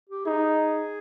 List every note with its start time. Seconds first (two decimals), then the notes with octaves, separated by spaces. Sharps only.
0.10 G4
0.25 D#4 G#4